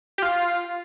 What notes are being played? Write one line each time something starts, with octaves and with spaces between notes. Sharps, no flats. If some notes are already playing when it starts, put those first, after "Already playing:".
G4
F4